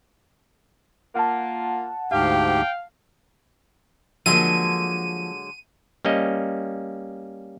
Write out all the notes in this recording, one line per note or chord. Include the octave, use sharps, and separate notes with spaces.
A#3 F4 F#5 A5
D2 G#2 G4 F5 G5
D3 F3 F#3 G#3 A#3 D#7
G3 A#3 C#4 D#5